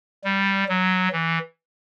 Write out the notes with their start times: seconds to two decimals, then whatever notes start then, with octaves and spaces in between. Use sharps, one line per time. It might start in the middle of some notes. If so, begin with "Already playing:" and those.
0.24 G3
0.69 F#3
1.12 E3